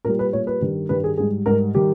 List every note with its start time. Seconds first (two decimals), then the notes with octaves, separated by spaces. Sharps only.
0.05 A#2 G3 A#4
0.19 B4
0.33 A#2 G3 C#5
0.47 B4
0.61 G2 D#3 G3
0.89 G2 D#3 G3 B4
1.04 G#4
1.18 G#2 G3 G#4
1.46 G#2 G3 A#4
1.75 D#3 G3 G4